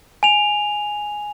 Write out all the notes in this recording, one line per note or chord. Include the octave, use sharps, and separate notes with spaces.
G#5 F7